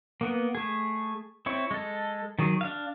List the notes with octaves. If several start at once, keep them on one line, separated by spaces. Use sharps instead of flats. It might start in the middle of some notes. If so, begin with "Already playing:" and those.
A#3 B3 F#5
A3 G#4
C4 E4 C#5
G#3 A4
D#3 F#3 G#4
D4 F5